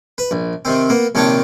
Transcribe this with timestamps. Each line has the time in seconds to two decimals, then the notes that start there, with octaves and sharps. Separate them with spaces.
0.18 B4
0.31 A#1
0.65 C3 D#3 C4
0.89 A#3 B3
1.15 A#1 C3 D#3 C#5 G5 A5